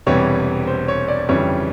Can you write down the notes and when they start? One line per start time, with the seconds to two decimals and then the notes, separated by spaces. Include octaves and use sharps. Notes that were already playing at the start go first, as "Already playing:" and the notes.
0.06 E1 E2 C3 E3 G3 C#5
0.67 C5
0.88 C#5
1.08 D5
1.29 G1 F2 C#3 E3 G3 C#5